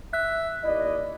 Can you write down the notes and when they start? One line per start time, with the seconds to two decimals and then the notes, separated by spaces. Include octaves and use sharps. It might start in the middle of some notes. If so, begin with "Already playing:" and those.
0.13 E5 F#6
0.64 D#2 E4 D5 D#5